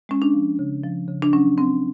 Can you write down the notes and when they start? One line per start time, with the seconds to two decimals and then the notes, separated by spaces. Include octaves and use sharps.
0.09 G#3 C#4
0.22 D4
0.34 F3
0.59 C#3
0.84 F3
1.08 C#3
1.22 D4
1.33 F#3 C#4
1.57 F#3 C4